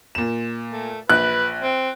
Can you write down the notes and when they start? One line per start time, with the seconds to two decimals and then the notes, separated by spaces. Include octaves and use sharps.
0.15 A#2 E7
0.71 A3
1.10 A#1 B4 F#6
1.62 C4